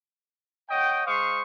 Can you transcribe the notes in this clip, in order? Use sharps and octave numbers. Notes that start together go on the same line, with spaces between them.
C#5 D#5 F#5 G5
G#3 C5 F5 C#6 D#6